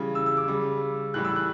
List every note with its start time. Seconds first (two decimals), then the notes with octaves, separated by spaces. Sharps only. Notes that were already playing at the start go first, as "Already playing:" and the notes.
Already playing: C#3 E3 G3
0.15 E6
0.26 E6
0.37 D6
0.48 C#3 G3
1.14 A2 E3 G3 F#6
1.25 E6
1.36 F#6